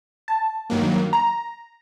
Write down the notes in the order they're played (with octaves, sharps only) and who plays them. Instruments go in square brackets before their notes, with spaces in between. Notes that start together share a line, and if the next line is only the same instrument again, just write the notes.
[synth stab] A5
[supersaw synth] G2 D#3 F#3 A#3
[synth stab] A#5